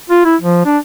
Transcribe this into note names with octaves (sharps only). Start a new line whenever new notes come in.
F4
E4
F3
D4